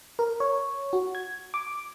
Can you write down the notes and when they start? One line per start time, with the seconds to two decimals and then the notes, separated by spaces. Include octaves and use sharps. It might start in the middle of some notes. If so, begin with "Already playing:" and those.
0.19 A#4
0.40 C#5
0.93 F#4
1.15 G#6
1.54 D6